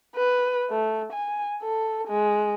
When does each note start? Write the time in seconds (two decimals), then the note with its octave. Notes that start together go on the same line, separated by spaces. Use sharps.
0.15 B4
0.71 A3
1.13 G#5
1.63 A4
2.08 G#3